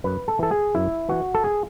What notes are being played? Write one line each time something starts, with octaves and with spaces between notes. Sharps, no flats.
F#2 B4
A4
E3 A4
G#4
F#2 E4
E3 F#4
A4
G#4